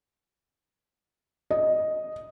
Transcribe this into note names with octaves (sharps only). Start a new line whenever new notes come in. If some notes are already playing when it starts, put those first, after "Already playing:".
D#5